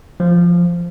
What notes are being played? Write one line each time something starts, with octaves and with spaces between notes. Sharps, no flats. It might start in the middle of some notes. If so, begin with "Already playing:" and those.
F3